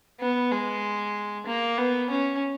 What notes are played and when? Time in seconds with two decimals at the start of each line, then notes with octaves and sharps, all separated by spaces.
0.20 B3
0.52 G#3
1.47 A#3
1.77 B3
2.10 C#4